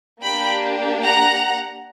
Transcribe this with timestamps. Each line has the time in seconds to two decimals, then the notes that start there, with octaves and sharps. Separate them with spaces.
0.22 A#3 D4 G4 G5 B5
1.03 F#5 A#5